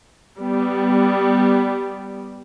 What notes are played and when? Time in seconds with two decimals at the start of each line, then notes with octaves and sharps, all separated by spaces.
0.40 G3 B3